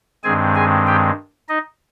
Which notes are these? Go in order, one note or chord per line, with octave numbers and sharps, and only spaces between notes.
G2 D#3 G#3 C4 G#4 G#5
G#4 G#5
G4 G5
D#4 D#5